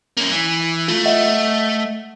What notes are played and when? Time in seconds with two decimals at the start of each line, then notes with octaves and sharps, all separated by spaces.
0.17 A#3 C#4
0.31 E3
0.88 A3 F4
1.06 D#5 E5 F#5